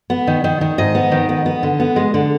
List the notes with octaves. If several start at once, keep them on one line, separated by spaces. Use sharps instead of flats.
B3
D#3
D#3
D#3
G#2 D#5
B3
D#3
B3
B3
D3
B3
G#3
D3